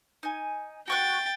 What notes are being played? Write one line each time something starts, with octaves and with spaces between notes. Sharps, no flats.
D#4 G#5
F#4 G5 C#6 F#6 A6